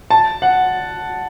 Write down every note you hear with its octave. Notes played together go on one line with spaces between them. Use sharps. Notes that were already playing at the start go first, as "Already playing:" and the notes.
A5
F#5